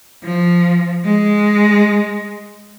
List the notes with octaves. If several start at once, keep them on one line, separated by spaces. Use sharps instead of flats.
F3
G#3